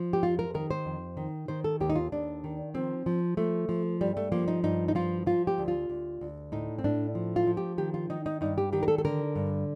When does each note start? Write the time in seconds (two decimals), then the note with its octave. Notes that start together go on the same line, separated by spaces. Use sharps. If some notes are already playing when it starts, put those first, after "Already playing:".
Already playing: F3
0.13 G4
0.23 F2 F4
0.39 A#4
0.54 D#3 A#4
0.71 C5
0.86 F2
1.17 D#3
1.48 D#3 C5
1.64 A4
1.80 D#2 G4
1.90 D#4
1.96 F4
2.12 D#2 D4
2.44 D#3
2.74 F3 C4
3.06 F3
3.37 F3 A3
3.69 F3
4.01 G2 G3
4.17 A3
4.32 F3 A#3
4.48 D#4
4.63 G2 D#4
4.88 D#4
4.95 F3 F4
5.26 F3 F4
5.47 G4
5.58 D2
5.68 F4
5.89 D2
6.21 D2
6.52 A2 D#4
6.79 C4
6.84 A2 D4
7.15 F3
7.36 F4
7.47 F3
7.57 G4
7.78 D#3 G4
7.94 F4
8.10 D#3 D#4
8.26 D#4
8.41 G2 D#4
8.58 G4
8.73 D#3 G4
8.83 A#4
8.88 A4
8.98 A4
9.05 D3 A#4
9.35 G2